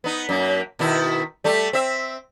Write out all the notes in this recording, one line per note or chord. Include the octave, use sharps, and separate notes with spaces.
B3 D#4
F#2 A#3
B2 D#3 E4
G3 A3
C4 E5